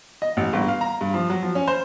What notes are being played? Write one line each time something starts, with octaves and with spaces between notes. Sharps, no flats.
D#5
A1
G1
F5
A#5
G2
F3
F#3
F3
C#4
C5